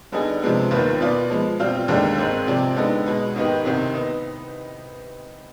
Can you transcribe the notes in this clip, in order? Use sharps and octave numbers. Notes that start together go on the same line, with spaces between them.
D3 G3 B3 D#4 G#4
C3 F3 G#3 B3 D4
D#2 D#3 B3 F4 B4
B2 B3 F4 B4 D5
F3 G#3 B3
B2 G3 C4 F4
D#2 D3 G#3 D4 G4
G#2 D#3 G#3 C4
C3 F3 C4 G4 D5
D3 G#3 B3 D#4
B2 G#3 B3
G#2 D#3 B3 D#4 G4
C2 C3 D#3
B3 D#4